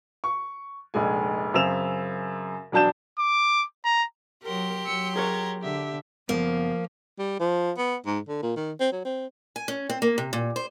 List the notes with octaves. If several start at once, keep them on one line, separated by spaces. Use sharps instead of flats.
C#6
F1 A#1 G#3 G#5
F#2 C#3 C4 E6 E7 F7
E1 F#3 D4 A5 G6 E7
D6
A#5
F#3 G4 A#4 C6
F#3 E6 C#7
G#4 A#4 C#5 A#5 G#6
D3 G4 E5
F#1 F3 A#3 B3
G3
F3
B3
G#2
D3
A#2
D#3
C4
F#3
C4
G#5
C#4
C4
A#3
C3
A#2
C5